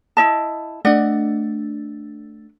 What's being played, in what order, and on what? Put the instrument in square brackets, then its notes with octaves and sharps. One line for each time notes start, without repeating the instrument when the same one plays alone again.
[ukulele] E4 D#5 A5
[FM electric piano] A3 D4 [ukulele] D5 D#5 F#5